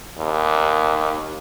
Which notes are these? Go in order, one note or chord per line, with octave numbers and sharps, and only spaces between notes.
D#2